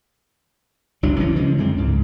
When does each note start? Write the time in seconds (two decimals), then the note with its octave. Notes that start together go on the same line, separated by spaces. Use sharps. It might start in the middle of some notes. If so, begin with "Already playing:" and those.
1.03 F#1 C2 F#3 D4
1.19 D2 E3 C#4
1.36 C#3 F3 G#3
1.58 F#2 D3 G#3 C4
1.77 C#2 G#2